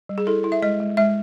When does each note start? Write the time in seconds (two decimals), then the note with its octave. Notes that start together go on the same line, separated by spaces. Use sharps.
0.09 G3
0.18 G#4
0.27 E4 A4
0.44 E4
0.52 E5
0.62 G#3 D#5
0.80 G#3
0.97 G#3 E5